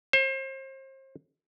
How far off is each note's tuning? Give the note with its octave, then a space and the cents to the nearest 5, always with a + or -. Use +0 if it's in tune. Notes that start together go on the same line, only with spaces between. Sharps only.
C5 +35